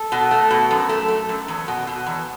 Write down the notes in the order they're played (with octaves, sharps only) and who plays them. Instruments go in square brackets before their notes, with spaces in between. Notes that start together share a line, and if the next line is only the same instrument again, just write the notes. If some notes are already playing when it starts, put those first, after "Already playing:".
Already playing: [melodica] A4
[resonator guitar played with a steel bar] B2
A3
B2
F#2
A3
A3
F#2
E2
B2
B2
E2